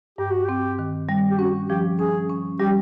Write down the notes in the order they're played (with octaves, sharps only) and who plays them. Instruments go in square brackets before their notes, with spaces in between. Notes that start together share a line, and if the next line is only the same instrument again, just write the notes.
[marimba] G2 [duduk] G4
[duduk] F#4
[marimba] C4 [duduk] G4
[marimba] D#3
G3
[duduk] G4
[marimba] C#4 [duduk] F#4
[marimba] F3 [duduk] G4
[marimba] C#4 [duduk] G#4
[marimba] C#4
[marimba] G3 [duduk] G4